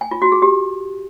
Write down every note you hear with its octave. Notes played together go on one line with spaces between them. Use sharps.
G#5
F4
F#4
G#4
G4